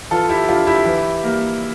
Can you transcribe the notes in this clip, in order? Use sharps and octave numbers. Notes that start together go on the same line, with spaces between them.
E3 F4 A4
E4 G4
G3 D4 F4
E4 G4
E3
G3 A#3